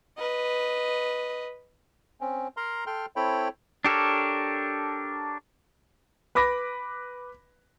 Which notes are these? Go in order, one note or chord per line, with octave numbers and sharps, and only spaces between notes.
B4 D#5
C4 C#4
A#4 A#5 C6
A4 G5 C6 F6
C4 E4 A4 C#5 G5 B5
D4 G4 A4 A#4 C#5
B4 B5 D6 A#6